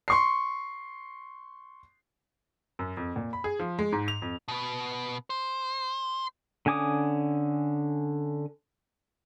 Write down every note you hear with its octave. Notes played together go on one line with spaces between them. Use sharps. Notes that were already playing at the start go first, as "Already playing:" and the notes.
C6 C#6 C7
F#2
F2
A#2
B5
G#4
F3
G#3
G#2
F7
F2
B2 B3
C5
D3 C#4 G#5 D6 D#6